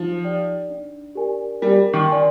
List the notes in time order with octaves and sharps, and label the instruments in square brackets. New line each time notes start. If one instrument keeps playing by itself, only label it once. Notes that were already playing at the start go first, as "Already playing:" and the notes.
Already playing: [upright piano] F3 [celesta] D#4
[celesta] G4 D5 G5
D4
G4 A#4 D5 G#5
[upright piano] G3 [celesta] A#4
[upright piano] D#3
[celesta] D5 G#5 C6